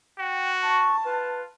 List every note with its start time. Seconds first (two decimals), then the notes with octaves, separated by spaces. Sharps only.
0.18 F#4 G5
0.63 A5 C#6
1.05 F4 B4